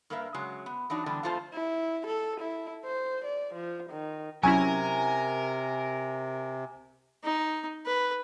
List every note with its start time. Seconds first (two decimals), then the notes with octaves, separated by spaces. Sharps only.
0.10 G2 A#3 A#4 B4 E5
0.34 C#3 F#3 G#3
0.66 B3
0.90 E3 F#3 D4 D#4
1.06 D3 E3 G3 B3 D4
1.23 F2 A3 F4 C5 A5
1.54 E4
2.07 A4
2.40 E4
2.85 C5
3.25 D5
3.54 F3
3.90 D#3
4.43 C3 F#3 C#4 E4 A#4 G#5
7.23 D#4
7.85 B4